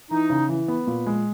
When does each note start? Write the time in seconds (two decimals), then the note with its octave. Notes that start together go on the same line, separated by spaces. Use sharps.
0.10 E3 D#4
0.30 C#3
0.49 E3
0.68 B3
0.87 A#2
1.07 G#3